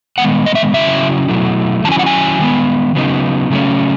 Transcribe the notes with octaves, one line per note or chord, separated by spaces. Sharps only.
D#3 G#3 B3 F#5
D#5
E5
C#3 F#3 C#4 E4 E5
B2 F#3 A3 E4
D#3 F#3 C#4 E4 A5
G#5
F#5
G#5
D#3 G#3 B3
C#3 F#3 B3 D#4
C#3 F#3 A3 C#4